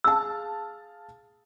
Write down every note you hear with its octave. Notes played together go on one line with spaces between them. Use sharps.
G#4 F5 A5 E6